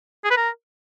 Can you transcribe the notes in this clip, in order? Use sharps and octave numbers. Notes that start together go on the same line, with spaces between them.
G#4
B4
A#4